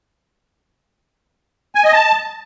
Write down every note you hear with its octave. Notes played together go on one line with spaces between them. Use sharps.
G#5
D#5
A5